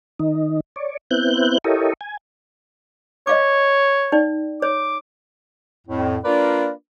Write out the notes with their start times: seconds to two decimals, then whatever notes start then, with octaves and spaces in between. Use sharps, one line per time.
0.20 D#3 D#4
0.76 C#5 D5
1.11 B3 C4 E4 F#6 G6
1.64 E4 G4 A4 A#4 C#5 D#5
2.01 G#5
3.27 C#5 D#5 F5 D6
4.12 D#4 D5 G5
4.62 C#5 D6
5.87 F2 A2
6.24 A#3 D4 F4 A#4 B4 D5